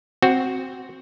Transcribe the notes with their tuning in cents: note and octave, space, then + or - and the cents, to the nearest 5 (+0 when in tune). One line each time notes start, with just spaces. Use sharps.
C4 +0 F#4 +0